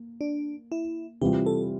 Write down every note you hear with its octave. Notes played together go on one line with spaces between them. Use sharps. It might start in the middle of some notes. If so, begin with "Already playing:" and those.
Already playing: A#3
D4
E4
C3 E3 G3 C4 F4 G4
A4